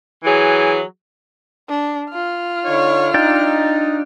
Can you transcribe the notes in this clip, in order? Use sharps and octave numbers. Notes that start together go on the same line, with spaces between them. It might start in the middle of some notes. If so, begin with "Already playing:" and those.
E3 F#3 G#4
D4
F4 F6
D3 D#4 C#5
D4 D#4 D5 G5